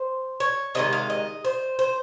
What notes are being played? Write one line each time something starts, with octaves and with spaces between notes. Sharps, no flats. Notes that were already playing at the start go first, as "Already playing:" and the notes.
Already playing: C5
C#5
C3 D#3 G#3 D#5
F5
D#5
C5
C5